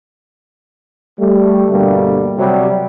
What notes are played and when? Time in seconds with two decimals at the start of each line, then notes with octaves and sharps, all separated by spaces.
1.19 G3 A3
1.71 G2 B2 D3 G3 A3 A#3
2.38 C3 F#3 G3